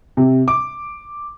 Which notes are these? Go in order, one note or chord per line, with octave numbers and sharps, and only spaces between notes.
C3
D6